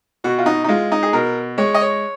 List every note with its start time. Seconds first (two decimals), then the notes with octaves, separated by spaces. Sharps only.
0.24 B2 F#4
0.38 F4
0.46 D#4
0.64 D#4
0.69 G#3 F4
0.92 D#4
1.03 G#4
1.13 B2 A#4
1.58 G#3 C#5
1.74 D#5
1.81 C#5